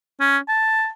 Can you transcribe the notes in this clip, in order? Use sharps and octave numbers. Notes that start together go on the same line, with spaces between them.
C#4
A5